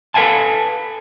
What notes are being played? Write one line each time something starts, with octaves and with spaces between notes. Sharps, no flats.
A4 B4 D#5 F5 G#5 A5